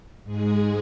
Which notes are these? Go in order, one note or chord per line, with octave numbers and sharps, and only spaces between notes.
G#2 G#3 G#4